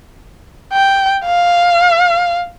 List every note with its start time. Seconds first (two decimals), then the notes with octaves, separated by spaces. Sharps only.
0.73 G5
1.25 F5